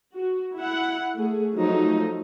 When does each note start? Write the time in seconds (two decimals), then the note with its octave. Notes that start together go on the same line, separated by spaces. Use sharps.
0.15 F#4
0.57 E4 F#5
1.16 A3 G#4
1.57 F3 F#3 A3 D#4